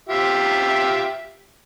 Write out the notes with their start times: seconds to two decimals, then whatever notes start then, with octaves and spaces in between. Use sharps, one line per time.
0.09 F4 G4 E5